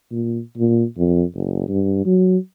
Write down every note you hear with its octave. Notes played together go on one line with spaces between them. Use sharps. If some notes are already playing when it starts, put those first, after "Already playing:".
A#2
A#2
F2
F#1
G2
F#3